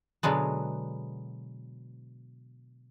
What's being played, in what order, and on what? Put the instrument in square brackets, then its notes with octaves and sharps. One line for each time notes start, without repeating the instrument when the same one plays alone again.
[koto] B2 D3 F#3 G#3 B3